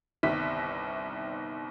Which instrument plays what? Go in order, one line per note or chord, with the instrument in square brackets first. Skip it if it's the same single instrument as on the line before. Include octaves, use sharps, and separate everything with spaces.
[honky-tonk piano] G1 C2 D#3 E5 B6